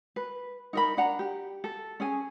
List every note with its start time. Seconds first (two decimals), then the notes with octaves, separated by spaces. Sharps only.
0.16 B4
0.73 D#4 A#4 B5
0.97 D4 F#5 A#5
1.19 G4
1.64 A4
2.00 C#4 G#4 G#5